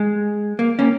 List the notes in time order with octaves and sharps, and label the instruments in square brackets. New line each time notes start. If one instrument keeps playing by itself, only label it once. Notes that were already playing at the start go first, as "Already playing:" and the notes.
Already playing: [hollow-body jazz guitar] G#3
A#3
A#3 C#4